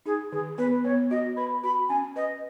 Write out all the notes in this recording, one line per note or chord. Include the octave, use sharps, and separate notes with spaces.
D#4 G#4
D#3 G#4
B3 B4
B3 C#5
F#4 D#5
B4 B5
F#4 B5
C#4 G#5
B4 D#5